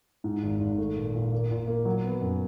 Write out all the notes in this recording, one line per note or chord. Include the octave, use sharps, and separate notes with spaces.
G#2
G#1
G#1
A3
A#2
A#2
A#3
A#2
A#3
F#3
B3
F#2